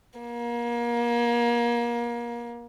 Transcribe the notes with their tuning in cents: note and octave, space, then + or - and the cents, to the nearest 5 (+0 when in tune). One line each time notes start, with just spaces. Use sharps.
A#3 +30